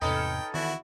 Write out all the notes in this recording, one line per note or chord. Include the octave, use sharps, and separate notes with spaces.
E2 G#2 C3 C#4 D#4 A4 B4 G5
E2 D#3 E4 F#4